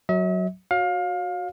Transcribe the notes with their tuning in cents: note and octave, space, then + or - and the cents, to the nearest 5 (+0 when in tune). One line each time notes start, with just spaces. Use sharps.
F#3 +0 E5 -45
F#4 -15 C#5 +0 F5 +25